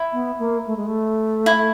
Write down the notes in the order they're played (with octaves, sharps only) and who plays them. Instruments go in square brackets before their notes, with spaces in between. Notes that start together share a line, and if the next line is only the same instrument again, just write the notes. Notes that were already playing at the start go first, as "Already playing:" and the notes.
Already playing: [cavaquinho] E4
[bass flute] B3
A#3
A3
G#3
A3
[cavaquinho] E4